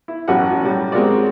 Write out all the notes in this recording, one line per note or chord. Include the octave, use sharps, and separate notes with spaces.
E4
A1 F#2 C#4 F#4 G4 F#5
A2 G3
G#3 C4 F#4 A#4 C#5 D5